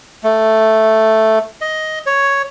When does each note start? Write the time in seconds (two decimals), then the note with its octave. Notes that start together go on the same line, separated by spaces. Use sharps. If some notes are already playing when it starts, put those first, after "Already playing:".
0.23 A3
1.61 D#5
2.06 C#5